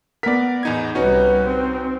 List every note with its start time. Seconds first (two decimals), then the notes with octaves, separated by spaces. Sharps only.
0.23 B3 A#4 D5 B6
0.63 E2 A2 D#4 G#6
0.95 C2 G3 C#4 D#4 F#4 B4
1.43 C4